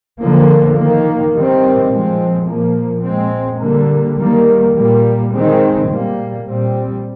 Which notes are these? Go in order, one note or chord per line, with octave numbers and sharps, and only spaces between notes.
D3 F3 A#3
D#3 A#3
D#3 G3 C4
A#2 F3 G#3 C4
A#2 F3 A#3
A#2 G#3 C4
D3 G3 A#3
D#3 G3 A#3
A#2 G3 A#3
D#3 G#3 C4
A#2 G3 A#3
A#2 G3 C4